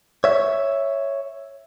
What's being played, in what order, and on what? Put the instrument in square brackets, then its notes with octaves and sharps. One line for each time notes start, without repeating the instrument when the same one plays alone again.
[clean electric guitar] C#5 E5